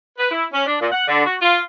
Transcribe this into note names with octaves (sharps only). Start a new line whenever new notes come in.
B4
E4
C#4
D4
A#2
F#5
D3
F#4
F4